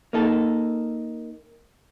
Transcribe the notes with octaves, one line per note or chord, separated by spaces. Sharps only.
A#3 D#4 A4